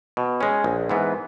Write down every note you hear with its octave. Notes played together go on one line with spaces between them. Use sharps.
B2
G#3 C#4
A#1
G#2 E3 B3